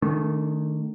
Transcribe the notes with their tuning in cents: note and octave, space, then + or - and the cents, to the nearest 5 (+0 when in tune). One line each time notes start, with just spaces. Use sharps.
D#3 -20 A3 +0 D4 -45